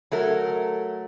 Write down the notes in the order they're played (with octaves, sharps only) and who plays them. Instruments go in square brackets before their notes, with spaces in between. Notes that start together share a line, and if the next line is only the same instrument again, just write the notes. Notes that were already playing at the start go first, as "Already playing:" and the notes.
[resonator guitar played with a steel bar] F#3 A3 A#4